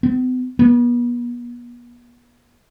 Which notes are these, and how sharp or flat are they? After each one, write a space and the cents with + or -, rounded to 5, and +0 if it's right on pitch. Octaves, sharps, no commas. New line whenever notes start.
B3 +45
B3 -40